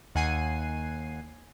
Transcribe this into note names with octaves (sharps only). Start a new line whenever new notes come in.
D#2 F#5 G#5 C7 D#7